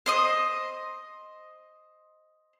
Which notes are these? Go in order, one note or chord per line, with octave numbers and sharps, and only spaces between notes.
C5 D#5 D#6